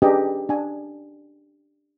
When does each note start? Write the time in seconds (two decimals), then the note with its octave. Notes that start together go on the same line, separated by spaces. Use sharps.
0.02 C#4 D4 G4 G#4 B4 D#5
0.49 D4 G#5